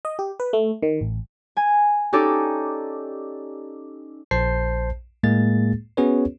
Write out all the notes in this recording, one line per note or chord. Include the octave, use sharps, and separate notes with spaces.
D#5
G4
B4
A3
D#3
A1
G#5
C#4 D#4 G4 A4 D5
A#1 C5 A5 G6 C7
A2 G#3 A#3 G#4 A6
B3 C#4 F#4 G#4 B4 C#5